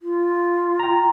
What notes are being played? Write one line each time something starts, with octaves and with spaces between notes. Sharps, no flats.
F4
G5 A#5